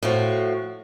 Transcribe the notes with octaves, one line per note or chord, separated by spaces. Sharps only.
A2 F3 F#4